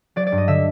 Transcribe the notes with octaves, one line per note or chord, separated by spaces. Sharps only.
F#3 D5
D5
G2
D#5
D3 E5